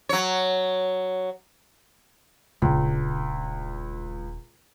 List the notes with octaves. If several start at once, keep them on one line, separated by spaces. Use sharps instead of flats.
F#3 C#5
D#1 C#2 D4